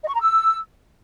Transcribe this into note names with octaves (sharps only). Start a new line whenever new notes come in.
D#5
C#6
A#5
E6